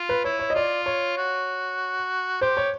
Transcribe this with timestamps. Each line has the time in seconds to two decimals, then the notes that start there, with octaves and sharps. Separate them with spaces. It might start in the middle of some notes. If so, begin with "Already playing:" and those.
Already playing: F4
0.09 B4
0.24 E4 C#5
0.39 C#5
0.50 D#5
0.55 F4 D5
0.86 C#5
1.17 F#4
2.41 G4 C5
2.57 C#5